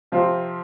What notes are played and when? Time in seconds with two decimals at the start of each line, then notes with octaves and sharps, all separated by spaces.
0.12 C3 F3 C4 F4